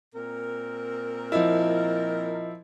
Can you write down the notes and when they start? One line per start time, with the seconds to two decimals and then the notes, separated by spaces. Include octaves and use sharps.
0.15 A#2 C4 A#4
1.32 F3 E4 D#5